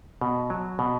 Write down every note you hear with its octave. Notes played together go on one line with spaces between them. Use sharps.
B2
F#3
B2